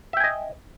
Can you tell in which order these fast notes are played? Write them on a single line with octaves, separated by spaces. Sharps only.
E5 G5 G#5 D#5